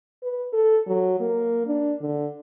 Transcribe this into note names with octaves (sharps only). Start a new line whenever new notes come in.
B4
A4
F#3
A#3
D4
D3